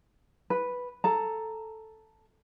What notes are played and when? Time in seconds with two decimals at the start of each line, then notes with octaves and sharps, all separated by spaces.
0.50 B4
1.04 A4 A#5